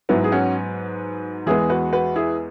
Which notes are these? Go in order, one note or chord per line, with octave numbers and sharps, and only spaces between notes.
G#2 F#3 B3 E4
G#4
C#4 F#4
E2 E3 G#3 B3 E4 G#4
F#4 B4
F#4 B4
E4 G#4